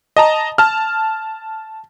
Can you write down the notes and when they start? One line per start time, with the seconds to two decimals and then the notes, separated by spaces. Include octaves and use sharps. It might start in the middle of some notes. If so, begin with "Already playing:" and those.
0.17 D#5 A5 A#5
0.58 A5 F6